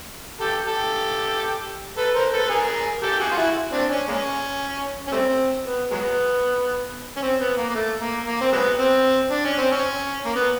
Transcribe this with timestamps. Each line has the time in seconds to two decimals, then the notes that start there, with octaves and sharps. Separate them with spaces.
0.40 G4 A4
0.66 G4 A4
1.97 A4 B4
2.15 A#4 C5
2.33 A4 B4
2.43 B4
2.50 G#4 A#4
3.03 G4 A4
3.20 F#4 G#4
3.31 F4
3.37 E4 F#4
3.72 C4 D4
3.90 C#4
4.08 G#3 A#3 C#4
5.07 C#4
5.12 G3 A3 C4
5.65 B3
5.91 F#3 G#3 B3
7.17 C#4
7.22 C4
7.40 B3
7.57 A#3
7.69 A#3
7.75 A3
8.00 A#3
8.26 A#3
8.41 C4
8.52 F#3 G#3 B3
8.79 C4
9.31 D4
9.45 C#4
9.58 C4
9.71 C#4
10.25 A#3
10.36 B3